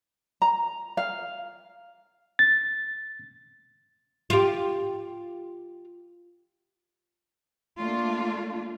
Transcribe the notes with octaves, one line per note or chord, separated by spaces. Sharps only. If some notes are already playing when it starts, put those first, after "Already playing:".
A#5
F5
A6
F4 G4
A3 A#3 D4 F4